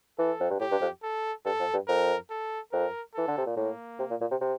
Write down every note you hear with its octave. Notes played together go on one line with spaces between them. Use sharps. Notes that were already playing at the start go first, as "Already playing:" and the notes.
E3 A4
F2
G2
A2 G4
G2
F2
A4
G2 A4
F2
G2
F2 A#4
A4
F2 A#4
E3 A4
D3
C3
A#2
A2 A#3
C3
A#2
A#2
C3
C3